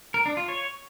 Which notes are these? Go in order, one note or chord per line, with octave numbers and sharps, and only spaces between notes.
A#4
D4
F4
C#5